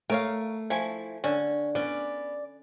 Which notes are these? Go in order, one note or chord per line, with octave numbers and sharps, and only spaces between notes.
A3 A#4 C#5 F5
F3 E4 C#5 G#5
D3 C#4
B3 C#4 D5